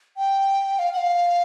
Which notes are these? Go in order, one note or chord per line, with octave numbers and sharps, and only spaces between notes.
G5
F5
F#5
F5